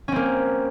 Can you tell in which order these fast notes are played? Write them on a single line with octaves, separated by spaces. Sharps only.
C#4 C4 A#3